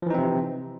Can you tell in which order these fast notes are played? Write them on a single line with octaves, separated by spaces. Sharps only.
F3 E3 D#4 C4 C3